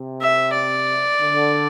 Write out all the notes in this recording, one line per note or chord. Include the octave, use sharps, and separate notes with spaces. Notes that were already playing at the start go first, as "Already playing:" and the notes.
Already playing: C3
E5
D5
D3